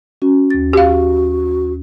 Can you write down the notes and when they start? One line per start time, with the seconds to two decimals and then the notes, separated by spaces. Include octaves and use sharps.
0.22 C#4 F#4
0.50 D#2 A6
0.73 F#4 G4 F5